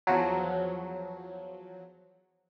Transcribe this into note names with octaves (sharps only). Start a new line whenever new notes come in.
E2 F3 F#3